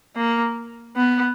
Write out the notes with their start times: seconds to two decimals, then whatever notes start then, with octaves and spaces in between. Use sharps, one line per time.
0.16 A#3
0.96 B3